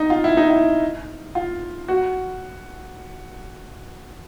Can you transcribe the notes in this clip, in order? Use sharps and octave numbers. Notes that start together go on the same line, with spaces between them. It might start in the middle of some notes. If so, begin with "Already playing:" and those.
Already playing: D#4
F4
E4
D#4
E4
F4
F#4